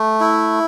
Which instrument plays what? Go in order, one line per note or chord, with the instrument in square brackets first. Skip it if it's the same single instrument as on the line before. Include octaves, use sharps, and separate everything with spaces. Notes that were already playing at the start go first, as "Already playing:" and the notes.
Already playing: [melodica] A3
E4